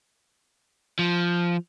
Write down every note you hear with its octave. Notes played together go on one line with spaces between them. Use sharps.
F3